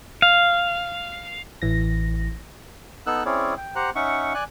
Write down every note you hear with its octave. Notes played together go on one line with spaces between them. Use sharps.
F5
A1 E3 A#6
B3 D#4 A4 E6 F#6
C4 C#4 E4 G#4 C#5 D5
G5
G4 C5 F#5 A#5 F#6
C#4 D#4 E5 F#5 C#6
D5 G#5 F#6